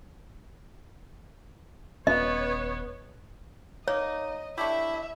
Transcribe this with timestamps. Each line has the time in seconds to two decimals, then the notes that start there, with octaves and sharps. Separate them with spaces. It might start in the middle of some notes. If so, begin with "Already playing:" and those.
2.07 D#1 B3 C#4 C#5 D#5
3.88 A#3 D#4 C#5 D#5
4.58 A3 D4 E4 G4 E5